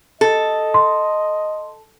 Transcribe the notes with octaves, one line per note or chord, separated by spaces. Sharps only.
A4 D#5
C6